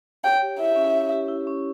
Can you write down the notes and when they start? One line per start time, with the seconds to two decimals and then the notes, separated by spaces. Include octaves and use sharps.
0.24 C#5 G5
0.42 G4
0.59 E4 E5
0.76 C#4
0.94 C#5
1.12 G4
1.29 E4
1.47 C#4